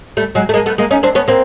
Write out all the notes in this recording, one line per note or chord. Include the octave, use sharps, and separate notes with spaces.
G3 A3
F#3 G#3
A3
G#3 A#3
A3 B3
G#3 A#3
C#4 D#4
C4 D4
B3 C#4
A#3 C4